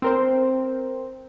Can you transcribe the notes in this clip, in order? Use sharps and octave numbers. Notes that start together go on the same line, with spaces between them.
C4 A#4 C5